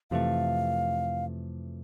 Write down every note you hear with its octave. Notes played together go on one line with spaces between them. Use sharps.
F2 C3 E3 A3 F5